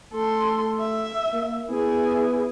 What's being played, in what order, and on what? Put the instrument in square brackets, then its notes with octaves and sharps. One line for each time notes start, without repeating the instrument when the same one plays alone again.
[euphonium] A3 [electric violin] A4 C6
[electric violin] E5
[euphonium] A#3
[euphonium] B3 [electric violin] E4 G#4